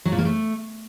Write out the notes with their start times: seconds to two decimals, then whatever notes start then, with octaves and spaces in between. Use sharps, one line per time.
0.05 F#3
0.12 A#2
0.19 A#3
0.25 A3